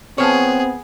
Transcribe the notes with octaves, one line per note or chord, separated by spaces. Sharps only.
F3 B3 C4 G#4 C#5